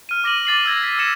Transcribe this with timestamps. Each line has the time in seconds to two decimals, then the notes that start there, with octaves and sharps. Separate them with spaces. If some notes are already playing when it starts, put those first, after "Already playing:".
0.09 F6 D#7
0.24 D6 A#6 D#7 F#7
0.45 D6 A6 C7 F#7
0.66 E6 G#6 A#6
0.83 B6
0.99 E6 A#6 C#7 E7